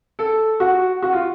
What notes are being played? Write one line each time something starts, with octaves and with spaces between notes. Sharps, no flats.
A4
F#4
F#4
F4